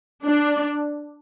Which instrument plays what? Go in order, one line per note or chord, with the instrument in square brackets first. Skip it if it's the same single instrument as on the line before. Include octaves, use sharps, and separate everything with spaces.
[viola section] D4